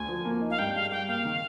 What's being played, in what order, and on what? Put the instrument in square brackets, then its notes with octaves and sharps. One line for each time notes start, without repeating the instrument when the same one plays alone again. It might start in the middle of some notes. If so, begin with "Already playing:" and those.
Already playing: [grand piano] D2 [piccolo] G#5
[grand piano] F3
A#3
D#4
[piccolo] F5
[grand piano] G2 [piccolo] G5
[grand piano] G#3 [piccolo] F5
[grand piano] G4 [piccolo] G5
[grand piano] A#3 [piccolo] F5
[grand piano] D#3